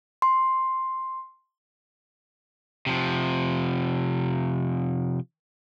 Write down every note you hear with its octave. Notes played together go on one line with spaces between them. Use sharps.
C6
C3 F3